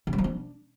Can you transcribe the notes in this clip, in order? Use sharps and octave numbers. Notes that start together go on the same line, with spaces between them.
C#3
F#3
F3
D4